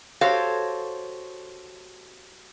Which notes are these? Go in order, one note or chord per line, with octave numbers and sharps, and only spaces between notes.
F#4 G4 A4 C5 C#5 F5